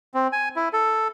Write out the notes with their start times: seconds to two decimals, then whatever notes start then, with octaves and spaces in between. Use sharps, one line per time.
0.14 C4
0.33 G#5
0.56 E4
0.73 A4